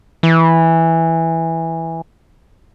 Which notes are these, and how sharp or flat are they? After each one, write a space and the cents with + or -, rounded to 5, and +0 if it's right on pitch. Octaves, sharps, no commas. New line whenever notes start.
E3 -5